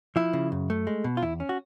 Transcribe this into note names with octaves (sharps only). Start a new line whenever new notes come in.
F3 E4
C#3
F#2
A3
G#3
B2
F4
E2 E4
C#4
F#4